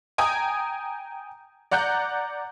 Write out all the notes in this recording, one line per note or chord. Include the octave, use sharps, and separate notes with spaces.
G5 G#5 A#5 D#6
D5 F#5 A#5 F#6 G6